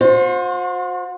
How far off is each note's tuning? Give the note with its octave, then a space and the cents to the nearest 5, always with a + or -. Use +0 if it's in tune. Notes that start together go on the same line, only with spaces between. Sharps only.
F#4 -45 C5 +5